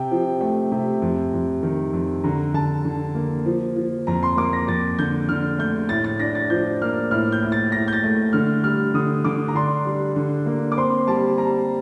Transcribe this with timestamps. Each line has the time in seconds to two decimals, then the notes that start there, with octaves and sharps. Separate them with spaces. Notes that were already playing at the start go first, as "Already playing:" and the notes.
Already playing: C3 G5
0.11 F3
0.41 A3 G5
0.72 C3
1.02 F2
1.33 F2
1.63 D#3
1.93 F2
2.24 D3 A#5
2.54 D3 A5
2.85 D3
3.15 A#3
3.46 F3
3.76 F3
4.07 F2 A#5
4.23 C6
4.37 A#3 D6
4.53 A#6
4.68 F2 A6
4.99 D3 G6
5.29 D3 F6
5.59 A3 G6
5.89 A2 A6
6.04 A6
6.20 D4 A#6
6.35 A6
6.50 F3 G6
6.82 A#3 F6
7.11 A2 F6
7.32 G6
7.43 A2
7.52 A6
7.72 A2 A#6
7.88 G6
7.93 A6
8.03 A3
8.33 D3 F6
8.64 G3 F6
8.94 D3 D#6
9.25 D3 D6
9.48 A#5
9.55 D4 C6
9.85 G3
10.16 D3
10.46 A#3
10.72 D6
10.77 C4 C6
11.07 G3 A5
11.38 G3 A#5